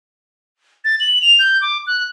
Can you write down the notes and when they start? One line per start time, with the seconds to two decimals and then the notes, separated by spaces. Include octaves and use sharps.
0.85 A6
1.00 F#7
1.22 F7
1.39 G6
1.62 D6
1.87 F#6